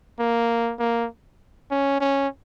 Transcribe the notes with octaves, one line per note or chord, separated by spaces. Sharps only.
A#3
A#3
C#4
C#4